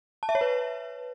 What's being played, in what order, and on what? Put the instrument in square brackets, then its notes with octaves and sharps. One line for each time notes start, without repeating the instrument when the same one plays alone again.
[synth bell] A5
E5
C#5
B4